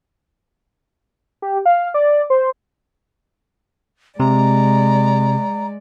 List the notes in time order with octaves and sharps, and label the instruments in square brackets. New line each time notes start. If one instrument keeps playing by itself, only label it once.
[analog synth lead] G4
F5
D5
C5
[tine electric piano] C3 [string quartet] G#3 D5 [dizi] A#5